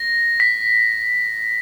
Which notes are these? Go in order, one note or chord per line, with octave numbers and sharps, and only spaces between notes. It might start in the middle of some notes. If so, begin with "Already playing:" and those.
Already playing: A#6
B6